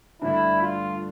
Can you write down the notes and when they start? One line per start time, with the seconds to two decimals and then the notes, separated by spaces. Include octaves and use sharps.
0.22 G2 D3 A3 D4 E4
0.62 F4